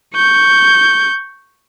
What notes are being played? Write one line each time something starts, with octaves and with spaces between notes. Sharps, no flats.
C#6 G6